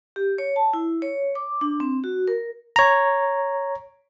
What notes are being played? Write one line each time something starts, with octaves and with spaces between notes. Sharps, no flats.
G4
C#5
A5
E4
C#5
D6
D4
C4
F#4
A#4
C#5 A#5